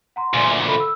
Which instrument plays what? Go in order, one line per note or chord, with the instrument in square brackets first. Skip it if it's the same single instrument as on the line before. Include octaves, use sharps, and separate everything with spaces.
[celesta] F#5 A#5 C6
[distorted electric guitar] D2 A#2 [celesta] G#5 C6
[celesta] E5
A4 B5
E6